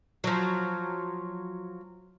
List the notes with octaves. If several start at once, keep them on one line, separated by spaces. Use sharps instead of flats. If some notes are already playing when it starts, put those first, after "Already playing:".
F3 F#3